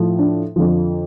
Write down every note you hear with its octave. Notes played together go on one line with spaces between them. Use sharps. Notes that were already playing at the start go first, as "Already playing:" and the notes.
Already playing: A2 F3
D4
F2 D3 F3